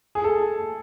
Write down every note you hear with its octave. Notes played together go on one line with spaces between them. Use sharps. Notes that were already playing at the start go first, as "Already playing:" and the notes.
G#4
A4